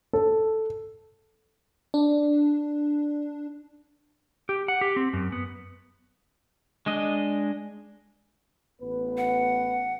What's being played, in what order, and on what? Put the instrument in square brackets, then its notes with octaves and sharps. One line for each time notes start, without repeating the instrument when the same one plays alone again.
[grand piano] A4
[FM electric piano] D4
[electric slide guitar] G4
F#5
G4
C4
F#2
B3
[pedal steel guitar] G#3 D4 D#5
[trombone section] A1 B3 B4
[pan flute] F#5